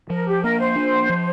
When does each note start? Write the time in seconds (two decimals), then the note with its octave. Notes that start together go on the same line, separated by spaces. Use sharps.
0.10 F3 A#4
0.27 G4
0.43 A#3 A#4
0.59 C5
0.76 D4
1.09 F3